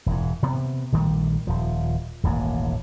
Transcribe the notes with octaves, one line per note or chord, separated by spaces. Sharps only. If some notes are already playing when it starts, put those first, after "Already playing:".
E1 G#2
C3 B3
A#1 D#3 G3 A3
D#1 F3
D#1 A1 G#2 A#3